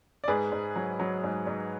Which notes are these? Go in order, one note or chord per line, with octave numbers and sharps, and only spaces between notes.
D5
G#2 G#4 B4
G#2
F#3
F#3
G#2
G#2